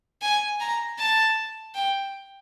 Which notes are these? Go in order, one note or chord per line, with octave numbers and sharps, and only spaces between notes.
G#5
A#5
A5
G5